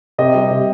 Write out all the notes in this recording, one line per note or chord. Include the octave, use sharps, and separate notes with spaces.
C3 D#5
G3
C3